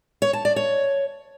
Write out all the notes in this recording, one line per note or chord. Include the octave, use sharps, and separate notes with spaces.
C#5
A5
D5
C#5